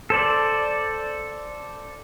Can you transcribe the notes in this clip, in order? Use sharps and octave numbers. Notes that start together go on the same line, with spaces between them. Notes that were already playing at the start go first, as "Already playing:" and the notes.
A4 C5 D5